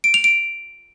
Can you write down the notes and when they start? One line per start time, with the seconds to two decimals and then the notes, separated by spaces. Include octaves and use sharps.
0.04 D7
0.14 F7
0.24 D7